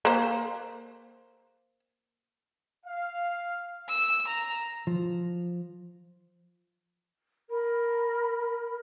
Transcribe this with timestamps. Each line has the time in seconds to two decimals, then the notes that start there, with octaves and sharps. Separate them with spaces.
0.05 A#3 C5
2.86 F5
3.89 E6
4.28 A#5
4.87 F3
7.51 A#4 B5